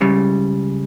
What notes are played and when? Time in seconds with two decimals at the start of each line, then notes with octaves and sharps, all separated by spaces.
0.01 C#2 C#3 G3